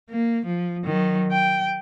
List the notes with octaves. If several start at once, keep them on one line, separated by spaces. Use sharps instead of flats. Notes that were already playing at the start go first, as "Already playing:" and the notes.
A#3
F3
D#3 F#3
G5